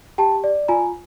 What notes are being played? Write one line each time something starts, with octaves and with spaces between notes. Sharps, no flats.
G4 G5 A5
D5
F4 G#5 A#5